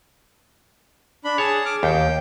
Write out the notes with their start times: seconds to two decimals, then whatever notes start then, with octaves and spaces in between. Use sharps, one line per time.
1.24 D4 B5
1.38 G#4 C#5 A5
1.65 D6 F6
1.83 D#2 G5